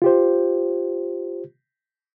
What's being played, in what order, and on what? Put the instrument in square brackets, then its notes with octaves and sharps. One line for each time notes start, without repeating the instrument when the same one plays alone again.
[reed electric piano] F4 G4 C5